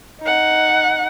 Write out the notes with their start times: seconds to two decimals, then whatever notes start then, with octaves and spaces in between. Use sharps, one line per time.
0.21 D#4 F#5